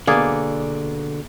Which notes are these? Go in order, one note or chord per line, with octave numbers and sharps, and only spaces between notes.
B2 D3 A#3 G#4 D5